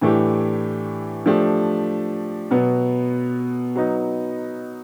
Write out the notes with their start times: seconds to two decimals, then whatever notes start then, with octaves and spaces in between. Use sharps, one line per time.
0.01 A2 E3 A3 D4 G4
1.26 F3 A3 D4 G4
2.51 B2 F#3 B3
3.75 F#3 B3 D#4